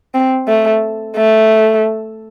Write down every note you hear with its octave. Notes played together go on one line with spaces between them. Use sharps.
C4
A3
A3